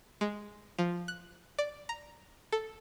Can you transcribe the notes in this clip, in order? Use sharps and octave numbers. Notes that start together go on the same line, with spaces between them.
G#3
F3
F#6
D5
A#5
A4